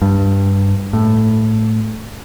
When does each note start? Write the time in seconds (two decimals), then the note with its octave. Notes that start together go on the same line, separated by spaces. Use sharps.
0.02 G2
0.93 A2